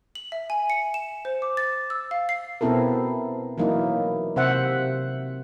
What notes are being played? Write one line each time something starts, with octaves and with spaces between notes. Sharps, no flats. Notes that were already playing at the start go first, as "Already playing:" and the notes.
F#7
E5
G#5
C#7
E7
C5
D6
A6
E6
F5
C7
B2 B3 C4 E4 A4 A#4
E3 F#3 A#3 D#4 E4
C3 C5 E5 F#5